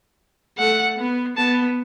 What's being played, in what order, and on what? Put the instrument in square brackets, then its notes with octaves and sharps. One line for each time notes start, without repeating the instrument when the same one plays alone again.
[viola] A3 [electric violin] F#5
[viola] B3
[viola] B3 [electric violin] A5